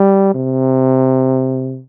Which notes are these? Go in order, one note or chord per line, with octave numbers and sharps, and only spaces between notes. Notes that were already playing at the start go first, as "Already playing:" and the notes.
Already playing: G3
C3